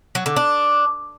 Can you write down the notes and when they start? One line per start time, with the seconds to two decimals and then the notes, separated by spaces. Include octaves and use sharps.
0.15 F#3
0.26 D3
0.36 D4